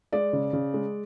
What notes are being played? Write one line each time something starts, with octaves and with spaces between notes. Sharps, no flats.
G#3 D5
C#3
C#3
G#3